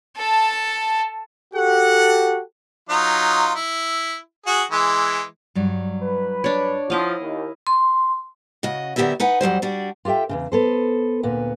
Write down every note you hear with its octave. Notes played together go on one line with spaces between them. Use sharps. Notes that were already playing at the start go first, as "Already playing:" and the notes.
A4 A5
F#4 G4 A4 F#5
F#3 D#4 F4
E4
F#4 G#4
E3 G#3
G2 F#3 G3
B4
D4 C#5
F3 E4 D#5 F5 F#5
D#2
C6
C#3 F#4 D#5
D3 F#3 B3 G4 A#4 E5
D#4 B4 F#5 G#5
F2 F#3 G3 C5
G3 D4 F#4
F4 G4 A4 E5 G5
E2 G2 C#3
B3 A4 C5
D2 A#2 B3